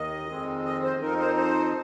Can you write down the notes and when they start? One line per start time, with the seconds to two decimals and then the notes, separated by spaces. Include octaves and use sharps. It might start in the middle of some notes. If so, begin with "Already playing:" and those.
Already playing: D#2 D#3 D#5
0.29 F2 D#3 G#3 C4
0.65 D#5
0.83 C5
1.00 F2 F3 C4 D#4 A#4
1.18 C5
1.37 C5